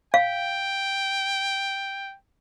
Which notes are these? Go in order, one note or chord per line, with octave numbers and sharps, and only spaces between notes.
F5 G5